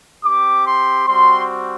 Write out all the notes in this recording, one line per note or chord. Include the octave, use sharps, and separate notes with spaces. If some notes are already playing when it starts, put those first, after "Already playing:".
C4 G4 D6
C6
G3 C4 F#4 C6